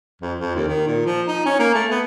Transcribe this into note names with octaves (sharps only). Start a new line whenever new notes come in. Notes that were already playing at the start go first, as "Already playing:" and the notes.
F2
F2
D#2
D#3
A#2
F3
D#4
C#4
A#3
A3
B3